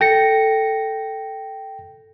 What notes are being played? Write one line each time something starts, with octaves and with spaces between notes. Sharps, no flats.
A4 G5 A#6 C#7